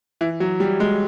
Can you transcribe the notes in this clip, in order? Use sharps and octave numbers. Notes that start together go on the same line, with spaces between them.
E3
F#3
G3
G#3